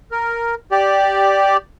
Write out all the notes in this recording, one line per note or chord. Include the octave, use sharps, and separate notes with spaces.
A#4
G4 D5